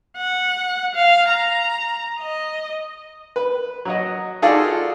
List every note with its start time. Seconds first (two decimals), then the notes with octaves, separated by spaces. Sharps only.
0.17 F#5
0.95 F5
1.29 A#5
2.19 D#5
3.36 B4
3.85 F#3 F#4 D#5
4.42 D#4 F4 F#4 G#4 A4 D5